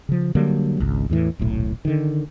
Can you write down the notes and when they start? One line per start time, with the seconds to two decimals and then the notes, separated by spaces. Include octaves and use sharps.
0.09 C#3 F3
0.35 D3 F#3 G3 A#3
0.80 G#1 C#2
1.10 E2 A2 E3
1.39 D#1 B1 A2
1.85 D3 D#3